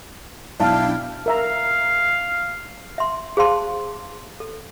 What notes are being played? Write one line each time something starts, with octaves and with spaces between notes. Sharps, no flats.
B1 D4 E4 F5 G5 A5 F6
A#4 E5 F5 A#5
E5 C6
G#4 C5 F5 A5 C6
A4